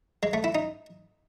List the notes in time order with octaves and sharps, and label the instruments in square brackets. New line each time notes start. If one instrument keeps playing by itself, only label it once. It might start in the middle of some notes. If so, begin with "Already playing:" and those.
[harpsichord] G#3
A3
E4
D#4